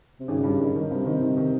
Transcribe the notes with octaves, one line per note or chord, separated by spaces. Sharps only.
C3
G#1 C#3
G2
D#3
D#3
G2 C3
D#3
D#3
D#3